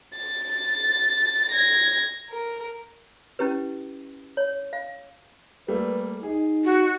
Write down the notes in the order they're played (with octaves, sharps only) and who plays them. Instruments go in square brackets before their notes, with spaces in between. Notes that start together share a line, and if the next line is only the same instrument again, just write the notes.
[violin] A6
G#6 A#6
A#4
[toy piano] C#4 E4 G4 B4
C#5
F5
[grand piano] G3 A3 A#3 [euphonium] B4
[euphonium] D#4 [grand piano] G#4
[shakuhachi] F#4